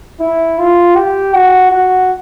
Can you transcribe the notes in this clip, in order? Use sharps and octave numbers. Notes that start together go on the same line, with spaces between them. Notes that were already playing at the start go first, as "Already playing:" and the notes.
E4
F4
G4
F#4
F#4